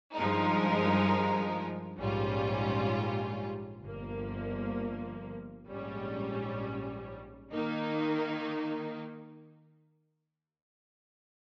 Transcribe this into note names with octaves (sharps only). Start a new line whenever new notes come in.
G2 F3 G#3 D#4 A#4
A#1 G#2 G3 C#4 F4
G1 G2 F3 A#3
A#1 G#2 G3 C#4
D#3 A#3 D#4